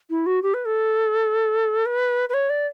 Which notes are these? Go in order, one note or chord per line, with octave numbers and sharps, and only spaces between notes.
E4
F#4
G4
B4
A4
B4
B4
C#5
D5